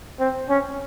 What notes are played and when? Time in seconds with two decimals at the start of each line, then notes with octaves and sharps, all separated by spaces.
0.19 C4
0.49 C#4